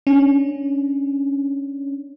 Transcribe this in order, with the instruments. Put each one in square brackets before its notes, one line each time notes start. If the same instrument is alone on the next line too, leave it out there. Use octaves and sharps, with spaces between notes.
[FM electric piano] C#4 D4